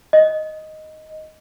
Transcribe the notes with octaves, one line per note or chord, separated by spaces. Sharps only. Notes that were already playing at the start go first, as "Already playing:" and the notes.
D#5